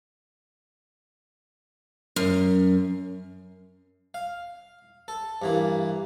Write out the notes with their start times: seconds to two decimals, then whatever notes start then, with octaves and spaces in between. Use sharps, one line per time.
2.16 F#2
4.14 F5
5.08 A4
5.42 G2 E3 A#3